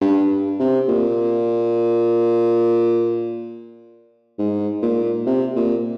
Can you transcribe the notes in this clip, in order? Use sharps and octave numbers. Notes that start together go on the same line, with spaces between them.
G2
C3
A#2
G#2
A#2
C3
A#2